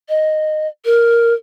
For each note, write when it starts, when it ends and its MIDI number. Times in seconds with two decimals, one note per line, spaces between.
0.09 0.68 75
0.85 1.34 70